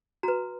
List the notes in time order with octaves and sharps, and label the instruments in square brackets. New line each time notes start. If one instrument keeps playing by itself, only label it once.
[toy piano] F#4 B4 A#5